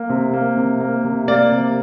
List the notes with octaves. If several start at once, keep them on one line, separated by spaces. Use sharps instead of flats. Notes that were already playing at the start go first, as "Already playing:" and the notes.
Already playing: A#3
C3
A#3
C3
A#3
C3
A#3 D5
C3